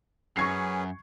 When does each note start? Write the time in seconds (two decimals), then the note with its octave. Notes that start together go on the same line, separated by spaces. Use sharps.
0.37 F#2 C#4 G#4 B4 C#6 G#6 C7